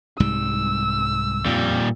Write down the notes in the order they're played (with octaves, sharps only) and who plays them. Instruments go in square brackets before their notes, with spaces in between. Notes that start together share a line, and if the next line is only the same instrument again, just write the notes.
[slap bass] C2 G#2 G3 [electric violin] E6
[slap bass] F2 [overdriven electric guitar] A#2 G3